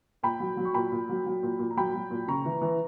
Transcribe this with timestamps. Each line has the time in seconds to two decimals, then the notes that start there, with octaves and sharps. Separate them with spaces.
0.23 A#2 G5 B5
0.40 F#3
0.57 F#3
0.65 C#6
0.74 A#2 G5 B5
0.92 A#2
1.09 F#3
1.26 F#3
1.43 A#2
1.59 A#2
1.71 A#5
1.77 F#3 G5 B5
1.94 F#3
2.11 A#2
2.28 C#3 A#5 C#6
2.45 E3
2.62 E3